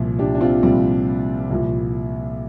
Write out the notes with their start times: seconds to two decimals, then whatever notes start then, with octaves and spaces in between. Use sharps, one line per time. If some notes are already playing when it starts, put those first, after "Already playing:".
Already playing: C2 A#2 F3
0.19 D4 G4
0.35 D4
0.41 C4 F4
0.63 C2 A#2 F3 G3 C4
1.50 C2 A#2 F3